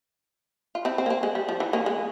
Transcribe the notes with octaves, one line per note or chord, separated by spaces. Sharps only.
F4
C4 E4
C4
A#3
C4
G#3
G3
F3
E3
A#3 C#4
G#3